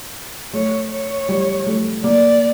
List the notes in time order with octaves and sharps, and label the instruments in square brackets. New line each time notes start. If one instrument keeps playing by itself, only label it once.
[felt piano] A3 [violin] C#5
[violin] C#5
[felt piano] G3
A3
[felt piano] A#3 [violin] D5